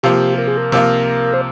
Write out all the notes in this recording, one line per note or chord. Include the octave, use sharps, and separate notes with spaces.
C3 F3 A#3 F4 G4
A#4
G#4
A#4
C3 F3 A#3 F4
C5